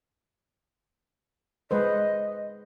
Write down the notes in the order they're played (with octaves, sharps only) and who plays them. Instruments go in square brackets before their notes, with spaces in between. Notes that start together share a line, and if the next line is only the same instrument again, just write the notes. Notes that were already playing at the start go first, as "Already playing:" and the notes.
[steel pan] G#3 B4 C5 [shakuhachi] D#5